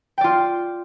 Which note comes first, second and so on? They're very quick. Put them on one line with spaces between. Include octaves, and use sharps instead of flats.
G5 D5 F4